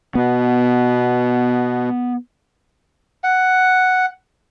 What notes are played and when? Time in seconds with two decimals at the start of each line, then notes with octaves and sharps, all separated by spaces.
0.15 B2 B3
3.24 F#5